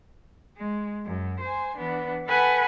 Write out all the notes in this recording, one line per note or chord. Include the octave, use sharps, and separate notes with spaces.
G#3
F#2
C5 G#5
E3 B3 D4
A4 B4 F#5 G#5 B5